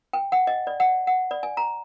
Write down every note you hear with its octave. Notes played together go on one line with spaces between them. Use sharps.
G5
F#5
D#5
D5
F#5
F#5
D5
G#5
A#5